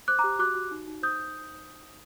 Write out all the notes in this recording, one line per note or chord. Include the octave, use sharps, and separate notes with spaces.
C5 D6 F#6
A#5 D6
G4
F#4 D6 F#6
F#4
D#4
D#4
C5 D#6 G6